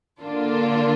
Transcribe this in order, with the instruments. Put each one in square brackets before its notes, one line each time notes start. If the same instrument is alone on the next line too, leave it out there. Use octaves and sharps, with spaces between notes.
[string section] D3 A#3 D4 F4